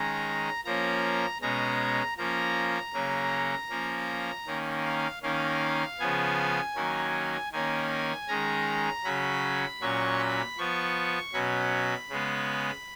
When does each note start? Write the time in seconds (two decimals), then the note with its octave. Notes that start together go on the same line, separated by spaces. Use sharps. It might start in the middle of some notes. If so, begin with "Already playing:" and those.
Already playing: D#3 G#3 C#4 A#5
0.64 F3 A#3 C#4 A#5
1.41 B2 G#3 C#4 A#5
2.17 F3 A#3 C#4 A#5
2.94 C#3 F#3 A#3 C#4
3.70 F3 A#3 C#4
4.46 D#3 A#3 C#4
4.85 F5
5.23 D#3 A#3 C#4 F5
5.99 C#3 F3 B3 G#5
6.76 D#3 F#3 A#3 C#4
7.52 D#3 A#3 C#4 G#5
8.28 D#3 G#3 C#4 A#5
9.04 C#3 F#3 C#4 B5
9.81 A#2 F#3 C#4 C#6
10.19 B5
10.58 F3 B3 C#6
11.33 B2 F#3 C#4 B5
12.10 C#3 G#3 B3